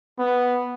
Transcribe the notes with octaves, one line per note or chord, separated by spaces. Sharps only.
B3